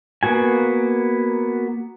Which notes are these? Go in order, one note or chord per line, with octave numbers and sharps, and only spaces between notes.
A#3 B3 F#4 G#5